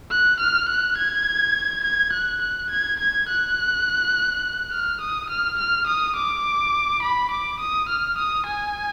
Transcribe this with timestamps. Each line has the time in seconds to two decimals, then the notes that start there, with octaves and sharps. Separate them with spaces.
0.11 F#6
0.40 F6
0.69 F#6
0.98 G#6
1.83 G#6
2.13 F#6
2.42 F#6
2.70 G#6
2.99 G#6
3.28 F#6
4.72 F6
5.01 D#6
5.30 F6
5.58 F6
5.87 D#6
6.16 D6
7.02 B5
7.31 D6
7.60 D#6
7.89 F6
8.18 D#6
8.46 G#5